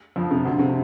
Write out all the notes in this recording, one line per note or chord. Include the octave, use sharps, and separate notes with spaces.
F2 F3
C3
D2 D3
C3